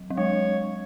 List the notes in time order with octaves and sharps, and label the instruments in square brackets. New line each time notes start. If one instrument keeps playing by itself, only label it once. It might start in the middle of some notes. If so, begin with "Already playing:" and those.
Already playing: [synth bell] F#3
F#3
[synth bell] G#3 [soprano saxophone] C#5